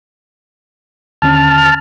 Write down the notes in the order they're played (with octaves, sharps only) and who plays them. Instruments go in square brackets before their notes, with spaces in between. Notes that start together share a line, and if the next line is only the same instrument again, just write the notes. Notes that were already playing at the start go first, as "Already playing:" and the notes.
[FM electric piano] D#2 D3 C#4 [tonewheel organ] A5 F6